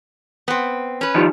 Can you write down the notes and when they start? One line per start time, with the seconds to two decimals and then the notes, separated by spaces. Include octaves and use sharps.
0.48 B3 C4
1.01 C#4 B4
1.15 D#3 F3 G3